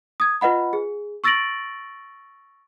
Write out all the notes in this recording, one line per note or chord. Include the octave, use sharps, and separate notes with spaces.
D#6 G#6
F4 B4 D#5 F#5 B5
G#4
C#6 E6 A6 A#6 D7 F#7